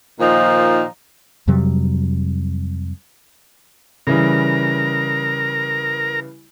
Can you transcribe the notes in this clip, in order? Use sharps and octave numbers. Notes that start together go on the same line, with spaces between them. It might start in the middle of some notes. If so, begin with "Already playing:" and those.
A#2 D#3 F3 D#4
F2 C3 F#3 G3
C#3 E3 G3 A#4 A#5